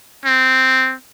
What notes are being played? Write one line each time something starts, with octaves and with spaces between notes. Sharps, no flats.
C4